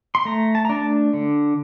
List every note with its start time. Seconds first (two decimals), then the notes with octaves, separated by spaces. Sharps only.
0.15 C6
0.25 A3 A#5
0.55 A5
0.65 D4 A#5
0.75 A5
1.13 D3